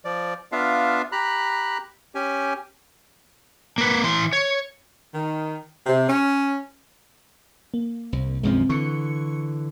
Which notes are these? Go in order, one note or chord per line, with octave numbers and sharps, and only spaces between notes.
F3 D5
B3 D4 F4 E5 F5
G4 A#5 B5 F#6
C#4 G4 G#5
A#3 B4
E3 C6
C#5
D#3
C3
C#4
A#3
C2
B1 F#2 F3 G#3 C4
D3 E3 C#6 C#7